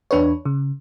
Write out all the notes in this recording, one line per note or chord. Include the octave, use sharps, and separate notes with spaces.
E2 D4 B4 C#5
C#3